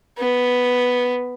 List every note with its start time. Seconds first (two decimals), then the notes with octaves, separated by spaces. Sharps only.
0.18 B3